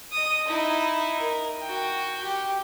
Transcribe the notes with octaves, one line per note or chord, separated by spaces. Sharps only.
D#5 D#6
D#4 E4
A#4
F#4 G5
G4